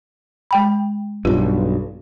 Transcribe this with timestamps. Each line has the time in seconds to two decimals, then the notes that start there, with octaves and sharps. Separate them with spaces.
0.51 G#3 G5 B5
1.25 B1 G2 F4